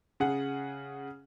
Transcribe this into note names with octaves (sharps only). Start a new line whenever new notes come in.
C#3 G#4 F#5